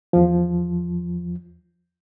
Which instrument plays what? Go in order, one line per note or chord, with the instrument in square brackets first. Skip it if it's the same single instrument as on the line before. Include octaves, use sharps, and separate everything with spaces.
[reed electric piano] E2 F3